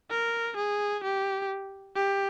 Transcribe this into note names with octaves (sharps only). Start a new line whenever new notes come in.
A#4
G#4
G4
G4